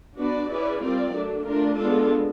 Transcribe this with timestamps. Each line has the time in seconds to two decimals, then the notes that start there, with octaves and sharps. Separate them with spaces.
0.17 B3 D4 F#4 B4 D5
0.49 C#4 E4 G#4 B4 D5
0.81 G3 C4 F4 A#4 D5
1.12 F#3 A3 D4
1.44 A3 D4 F4 A#4
1.76 G#3 B3 D4 F4 A4